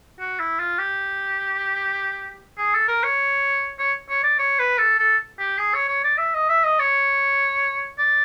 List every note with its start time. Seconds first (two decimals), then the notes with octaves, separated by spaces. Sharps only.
0.19 F#4
0.39 E4
0.59 F4
0.78 G4
2.58 G#4
2.74 A4
2.88 A#4
3.04 C#5
3.79 C#5
4.09 C#5
4.23 D5
4.39 C#5
4.59 B4
4.78 A4
4.99 A4
5.39 G4
5.58 G#4
5.74 C#5
5.88 C#5
6.04 D5
6.18 E5
6.34 D#5
6.49 E5
6.64 D#5
6.79 C#5
7.98 D5